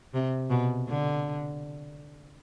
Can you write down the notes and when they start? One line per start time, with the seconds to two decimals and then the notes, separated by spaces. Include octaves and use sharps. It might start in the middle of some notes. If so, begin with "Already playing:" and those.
0.14 C3
0.50 B2
0.88 D3